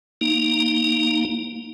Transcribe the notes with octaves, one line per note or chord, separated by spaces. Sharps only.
A#3 D#4